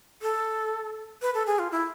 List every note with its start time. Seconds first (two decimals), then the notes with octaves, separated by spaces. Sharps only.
0.22 A4
1.22 B4
1.34 A4
1.47 G#4
1.59 F4
1.72 E4